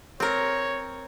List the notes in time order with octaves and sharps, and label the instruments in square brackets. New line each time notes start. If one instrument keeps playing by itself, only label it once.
[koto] C4 A#4 [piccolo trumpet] C#5